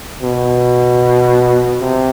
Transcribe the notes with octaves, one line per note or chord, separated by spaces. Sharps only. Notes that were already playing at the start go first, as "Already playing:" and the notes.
B2
C3